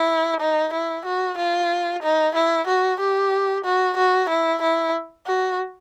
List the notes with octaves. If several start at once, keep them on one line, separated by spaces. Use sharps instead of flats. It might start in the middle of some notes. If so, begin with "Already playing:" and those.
Already playing: E4
D#4
E4
F#4
F4
D#4
E4
F#4
G4
F#4
F#4
E4
E4
F#4